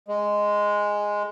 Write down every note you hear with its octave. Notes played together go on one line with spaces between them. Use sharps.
G#3